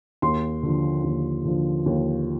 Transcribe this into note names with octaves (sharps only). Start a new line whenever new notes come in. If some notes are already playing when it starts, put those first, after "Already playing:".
D#2 C6
D3 F3
D#2
D3 F3
D#2